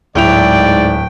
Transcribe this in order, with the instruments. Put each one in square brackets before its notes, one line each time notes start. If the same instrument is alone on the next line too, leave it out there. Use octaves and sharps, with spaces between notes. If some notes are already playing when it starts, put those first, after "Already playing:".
[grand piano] D1 E4 F7 [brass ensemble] G#2 D5 [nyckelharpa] G5